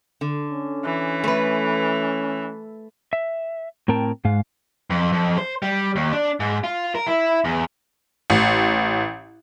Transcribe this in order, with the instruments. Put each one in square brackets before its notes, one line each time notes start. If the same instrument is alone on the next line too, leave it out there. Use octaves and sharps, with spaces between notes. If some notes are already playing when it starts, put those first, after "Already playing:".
[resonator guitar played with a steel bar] D3
[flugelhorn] C#4
[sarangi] E3
[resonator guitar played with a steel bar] A3 B4
[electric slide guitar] E5
A2 C4 A#4 G5 A5
G#2 G#3 F5
[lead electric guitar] F2
F2
C5
G3
D#2
D4
G#2
F4
A#4
E4
E2
[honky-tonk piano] A1